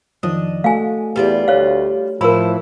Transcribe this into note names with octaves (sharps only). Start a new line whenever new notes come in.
F2 D#3 F3 D4 D#5
A3 F#4 A4 F5 G#5
E2 G3 F4 D5
D2 C#5 F5
A2 E3 F3 E4 A#4 B5